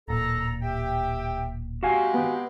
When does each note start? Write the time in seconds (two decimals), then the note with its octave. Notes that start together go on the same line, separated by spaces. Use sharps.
0.08 D1 A#2 A4 A#5
0.62 G4 E5 G5
1.83 G#3 C4 F#4 G4 F5 G#5
2.14 B3